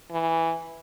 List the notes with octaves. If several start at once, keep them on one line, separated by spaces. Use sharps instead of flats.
E3